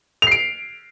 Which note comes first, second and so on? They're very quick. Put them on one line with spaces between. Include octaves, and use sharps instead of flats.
F7 C7 D7